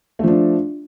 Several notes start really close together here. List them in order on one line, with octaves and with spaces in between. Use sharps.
A3 F3 D4